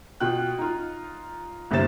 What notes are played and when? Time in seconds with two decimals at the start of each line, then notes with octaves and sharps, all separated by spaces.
0.20 B2 F4 G5 F#6
0.59 D#4 F4
1.71 G1 C2 A#3 C5 A6 E7